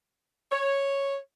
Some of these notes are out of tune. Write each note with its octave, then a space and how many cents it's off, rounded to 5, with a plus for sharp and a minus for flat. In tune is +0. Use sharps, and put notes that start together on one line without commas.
C#5 -5